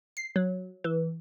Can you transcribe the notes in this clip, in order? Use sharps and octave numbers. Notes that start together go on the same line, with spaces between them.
C7
F#3
E3